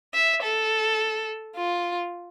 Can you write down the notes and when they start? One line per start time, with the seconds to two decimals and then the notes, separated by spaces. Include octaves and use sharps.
0.14 E5
0.43 A4
1.55 F4